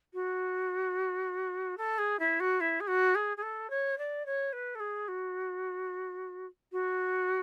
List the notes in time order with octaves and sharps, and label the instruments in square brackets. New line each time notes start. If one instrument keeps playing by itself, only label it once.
[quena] F#4
A4
G#4
E4
F#4
E4
G#4
F#4
G#4
G#4
A4
C#5
D5
C#5
B4
A4
G#4
F#4
F#4